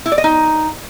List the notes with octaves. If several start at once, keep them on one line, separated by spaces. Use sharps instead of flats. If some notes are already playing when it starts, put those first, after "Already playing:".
E4
D5
D#5
D#4